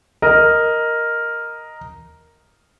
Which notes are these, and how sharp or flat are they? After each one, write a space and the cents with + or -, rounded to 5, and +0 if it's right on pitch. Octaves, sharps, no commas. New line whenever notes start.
A#4 +0 D#5 +0